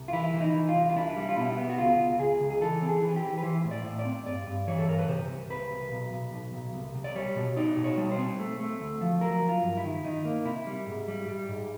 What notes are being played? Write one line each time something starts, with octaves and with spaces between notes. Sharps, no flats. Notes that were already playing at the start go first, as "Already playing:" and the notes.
Already playing: C2
F4
E3 E4
E3
D#4
E3
F4
C2
F4
D4 E4
G3
F4
B2 E4
B3
F#4
C#2 F4
C#2
C#2 G#4
C#2
G#4
E3 A4
C4
G#4
E3
G#4
G4
E3
B4
E3 C5
A2
D5
A2
D5
C4
G2 D5
G2
E3 C#5
A4
G2 A#4
B4
C3 C5
C2
C2 B4
C2
B1
B1
B1
B1
C2
C2
D5
G3 C#5
B2
D#4 D5
B2
C#5
G3
C5
C4
A3
A3
D2
F3
F#3 A#4
F#3
F4
G2
E4
D#3
D#3 D#4
A#3
C3 E4
G3
G#2
G3
G3
G#2